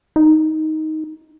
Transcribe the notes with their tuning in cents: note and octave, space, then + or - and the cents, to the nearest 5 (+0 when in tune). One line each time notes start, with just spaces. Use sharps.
D#4 +10